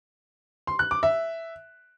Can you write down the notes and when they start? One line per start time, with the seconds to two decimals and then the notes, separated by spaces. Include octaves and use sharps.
0.67 C6
0.79 F#6
0.91 D6
1.03 E5